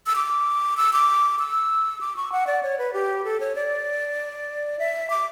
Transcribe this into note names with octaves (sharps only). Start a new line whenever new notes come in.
E6
D6
E6
D6
E6
D6
C#6
F#5
D5
C#5
B4
G4
A4
C#5
D5
E5
D6